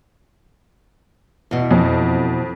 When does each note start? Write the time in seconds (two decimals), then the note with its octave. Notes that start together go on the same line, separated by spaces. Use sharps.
1.51 E2 B2
1.71 F2